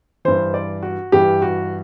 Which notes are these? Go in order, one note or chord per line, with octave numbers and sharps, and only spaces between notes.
G2 E3 C5
D5
F#4
G2 E3 G4
F#4